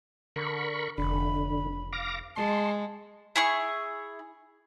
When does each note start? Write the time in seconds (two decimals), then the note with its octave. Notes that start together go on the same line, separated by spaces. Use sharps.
0.36 D3 A#4 B5 C#6
0.98 F1 D3 B5
1.93 F5 D6 A#6
2.36 G#3 A5 C6
3.36 E4 G#4 C#6